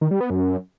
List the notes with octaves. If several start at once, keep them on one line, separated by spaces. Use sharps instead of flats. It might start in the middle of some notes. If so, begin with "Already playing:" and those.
D#3
G3
B3
F#2